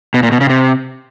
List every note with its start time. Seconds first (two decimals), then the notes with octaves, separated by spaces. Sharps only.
0.14 B2
0.23 A#2
0.32 B2
0.41 C#3
0.50 C3